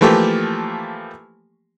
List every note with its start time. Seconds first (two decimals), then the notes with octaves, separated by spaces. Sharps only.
0.01 E3 F3 A3 A#3 G4